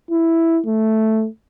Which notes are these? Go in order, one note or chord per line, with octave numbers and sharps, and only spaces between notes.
E4
A3